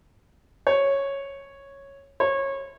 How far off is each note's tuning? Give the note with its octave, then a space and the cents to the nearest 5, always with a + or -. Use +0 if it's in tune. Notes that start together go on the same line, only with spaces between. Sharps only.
C#5 -5
C#5 -25